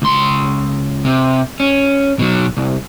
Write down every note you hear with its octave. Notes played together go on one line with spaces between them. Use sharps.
C#2 C6
C3
C#4
B2 F#3
C2